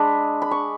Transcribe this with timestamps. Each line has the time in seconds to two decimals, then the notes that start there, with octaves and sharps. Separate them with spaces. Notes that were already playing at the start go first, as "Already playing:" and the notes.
Already playing: G#3 D4 B5
0.42 B5
0.51 C#6